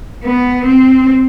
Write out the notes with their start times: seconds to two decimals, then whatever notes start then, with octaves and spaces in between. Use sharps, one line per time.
0.24 B3
0.65 C4